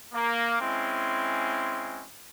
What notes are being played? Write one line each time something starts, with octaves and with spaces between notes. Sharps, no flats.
A#3
G#3 C4 C#4 E4